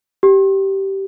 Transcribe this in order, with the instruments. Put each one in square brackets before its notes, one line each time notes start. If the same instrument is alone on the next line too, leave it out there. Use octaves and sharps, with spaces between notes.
[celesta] G4